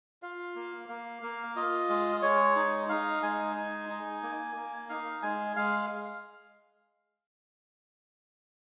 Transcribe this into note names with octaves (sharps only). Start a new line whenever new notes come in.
F4 F5
A#3
A#3
A#3
F4 D#5
G#3
G#3 C#5
D#4
D#4 F5
G#3 G#5
D#4
D#4
A#3
A#3
D#4 F5
G#3 G#5
G#3 F5